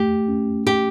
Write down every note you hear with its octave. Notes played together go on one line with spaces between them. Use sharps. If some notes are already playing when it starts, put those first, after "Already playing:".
Already playing: A3 G4
C#4
G4